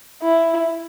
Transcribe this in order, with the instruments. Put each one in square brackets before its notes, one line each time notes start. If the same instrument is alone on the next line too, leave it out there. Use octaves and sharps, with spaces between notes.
[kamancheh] E4